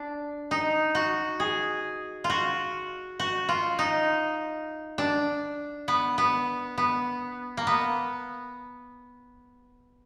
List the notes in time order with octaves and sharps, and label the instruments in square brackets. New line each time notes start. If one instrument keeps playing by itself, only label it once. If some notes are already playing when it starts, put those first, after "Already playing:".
Already playing: [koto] D4
D#4
F#4
G#4
F4
F#4
F#4
F4
D#4
D4
B3
B3
B3
A#3
B3